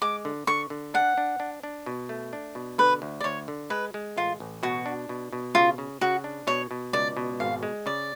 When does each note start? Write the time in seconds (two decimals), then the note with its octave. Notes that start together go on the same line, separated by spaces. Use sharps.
0.02 G#3 D6
0.25 D3
0.47 D3 C#6
0.70 D3
0.94 D4 F#5
1.18 D4
1.40 D4
1.63 D4
1.86 B2
2.09 A3
2.33 D4
2.55 B2
2.78 D3 B4
3.02 D2
3.20 D5
3.24 D2 C#5
3.48 D3
3.70 G#3 B4
3.94 G#3
4.16 A1 F4
4.40 A1
4.63 B2 F#4
4.86 D4
5.09 B2
5.32 B2
5.55 C#3 F4
5.78 C#3
6.01 C#3 F#4
6.24 D4
6.47 B2 C#5
6.71 B2
6.93 C#2 D5
7.17 B2
7.40 G#1 F5
7.63 G#3
7.86 C#3 D5